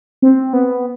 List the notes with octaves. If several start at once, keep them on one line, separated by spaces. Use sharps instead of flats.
C4
B3